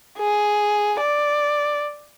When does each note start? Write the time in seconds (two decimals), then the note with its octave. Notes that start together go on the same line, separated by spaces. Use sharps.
0.19 G#4
1.01 D5